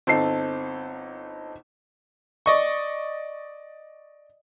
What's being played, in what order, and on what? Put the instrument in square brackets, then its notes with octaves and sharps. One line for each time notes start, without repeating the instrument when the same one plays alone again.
[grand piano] G1 A4 C7 [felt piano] C4 D#4
[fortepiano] D5 D#5 C#6